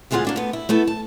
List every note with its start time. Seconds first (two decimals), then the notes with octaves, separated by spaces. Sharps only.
0.11 D2 G3 G#3 F4 G#4 F#5
0.25 A#3 D4 F#4
0.36 A3 B3
0.53 E4
0.69 A3 B3 E4 A4
0.87 A5